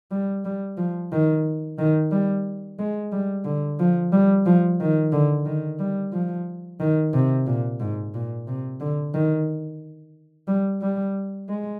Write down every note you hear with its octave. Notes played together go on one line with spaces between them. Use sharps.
G3
G3
F3
D#3
D#3
G3
G#3
G3
D3
F3
G3
F3
D#3
D3
D#3
G3
F3
D#3
C3
A#2
G#2
A#2
C3
D3
D#3
G3
G3
G#3